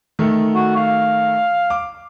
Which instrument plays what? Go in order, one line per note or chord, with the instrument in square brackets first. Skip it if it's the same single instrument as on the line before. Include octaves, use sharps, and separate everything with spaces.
[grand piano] D#3 A3
[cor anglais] F#4
F5
[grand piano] D6